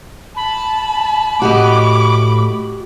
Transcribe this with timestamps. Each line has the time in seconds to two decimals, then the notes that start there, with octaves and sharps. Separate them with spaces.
0.36 A5 B5
1.42 A2 F#4 G4 D#5 D6